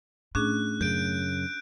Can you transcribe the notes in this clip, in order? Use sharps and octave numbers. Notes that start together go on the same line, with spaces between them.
A2 C#4 D4 G#4 F#6
F#2 C#3 G6 D7